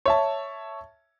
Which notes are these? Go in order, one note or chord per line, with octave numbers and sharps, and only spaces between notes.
C#5 E5 A5